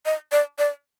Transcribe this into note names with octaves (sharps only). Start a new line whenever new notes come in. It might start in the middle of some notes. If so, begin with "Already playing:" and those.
D#5
D5
D5